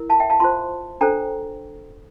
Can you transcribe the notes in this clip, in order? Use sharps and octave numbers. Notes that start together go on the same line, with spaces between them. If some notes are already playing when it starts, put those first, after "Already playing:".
Already playing: E4 A#4
F5 A5
E5 G5
F5 A5
F4 C5 A5 C6
D4 A4 C5 G5 A#5